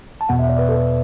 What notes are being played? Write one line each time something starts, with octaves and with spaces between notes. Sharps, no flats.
A5
E2 B2 B3 F#5
E5
D5
B4
A4